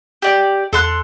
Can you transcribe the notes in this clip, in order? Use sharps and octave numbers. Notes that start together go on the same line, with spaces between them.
G4 D5
E2 A4 C6 F#6